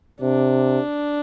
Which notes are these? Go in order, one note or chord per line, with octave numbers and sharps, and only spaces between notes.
C3 D4